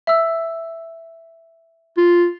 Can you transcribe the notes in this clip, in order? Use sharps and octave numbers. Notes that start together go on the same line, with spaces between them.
E5 E6
F4